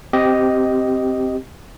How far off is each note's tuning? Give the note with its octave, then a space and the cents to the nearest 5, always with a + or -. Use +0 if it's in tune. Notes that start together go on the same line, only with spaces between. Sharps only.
C4 +0 G4 -10 D#5 +0